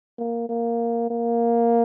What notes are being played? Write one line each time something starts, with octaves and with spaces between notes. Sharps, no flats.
A#3
A#3
A#3